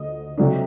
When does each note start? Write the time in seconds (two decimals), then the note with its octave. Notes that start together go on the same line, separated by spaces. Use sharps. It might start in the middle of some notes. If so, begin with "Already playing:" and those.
Already playing: D2 D3 D#5
0.38 C3 F#3 A3 D4